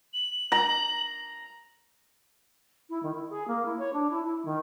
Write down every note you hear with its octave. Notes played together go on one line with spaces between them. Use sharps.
F#7
A#5
E4
D#3
E4
G#4
A#3
E4
C#5
D4
E4
E4
D#3